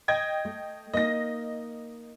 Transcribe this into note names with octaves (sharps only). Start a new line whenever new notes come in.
D#5 G5 G#6
A3
A#3 D#4 D#5 A#6